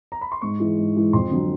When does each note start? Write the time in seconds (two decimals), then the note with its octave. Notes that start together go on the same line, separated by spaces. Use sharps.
0.12 A#5
0.21 B5
0.32 C6
0.41 G#2 C#6
0.60 E3 G#3
0.78 G#2
0.96 E3 G#3
1.13 F2 C6
1.31 D3 F#3